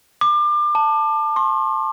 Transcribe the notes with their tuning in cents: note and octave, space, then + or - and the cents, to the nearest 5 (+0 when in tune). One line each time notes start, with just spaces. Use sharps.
D6 +30
A5 +10
C6 +35